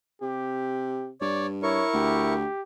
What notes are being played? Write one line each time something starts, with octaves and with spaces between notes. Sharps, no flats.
C3 G4
G2 C#5 D5
E4 A#4 C#5 C#6
D2 G4